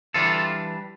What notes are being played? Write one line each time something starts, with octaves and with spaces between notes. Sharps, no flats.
E3 G3 D4 F4 A4